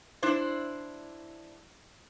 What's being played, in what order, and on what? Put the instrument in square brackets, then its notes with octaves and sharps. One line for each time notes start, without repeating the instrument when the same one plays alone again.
[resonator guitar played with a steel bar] D4 E4 C5